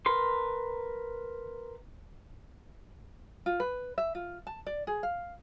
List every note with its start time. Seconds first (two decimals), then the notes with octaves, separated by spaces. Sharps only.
0.06 A#4 B4 C6
3.46 F4
3.60 B4
3.98 E5
4.15 F4
4.47 A5
4.67 D5
4.87 G#4
5.03 F5